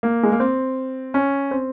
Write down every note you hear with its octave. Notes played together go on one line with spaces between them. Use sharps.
A#3
G#3
A#3
C4
C#4
C4